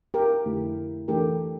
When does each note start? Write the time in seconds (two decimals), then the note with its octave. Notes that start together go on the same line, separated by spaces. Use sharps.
0.14 G4 A#4
0.45 F2 D3 A3 E4 G4
1.08 E3 A3 D4 G4 A4 A#4